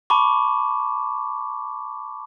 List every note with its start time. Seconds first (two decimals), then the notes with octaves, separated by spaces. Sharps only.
0.10 A5 B5 C#6 D6